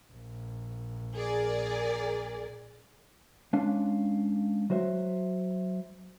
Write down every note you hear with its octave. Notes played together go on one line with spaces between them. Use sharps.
A#1
G#4 A#4 D5
G#3 C#4 D4 F5
F#3 F#4 C5 E5